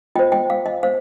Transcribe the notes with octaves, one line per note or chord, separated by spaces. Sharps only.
F4 C5 D#5 G5
D#5 G5
F5
D#5
C5 F5